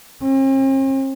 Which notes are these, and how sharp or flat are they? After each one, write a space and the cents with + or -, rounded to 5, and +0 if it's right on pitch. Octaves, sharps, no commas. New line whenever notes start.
C4 +45